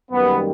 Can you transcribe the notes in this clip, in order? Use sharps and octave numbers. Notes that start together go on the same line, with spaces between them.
F#2 D#3 G3 A#3 B3